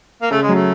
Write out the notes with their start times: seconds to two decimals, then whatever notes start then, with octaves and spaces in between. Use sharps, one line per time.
0.22 A#3
0.31 C#3 A3
0.42 G#3
0.49 F#3
0.54 A3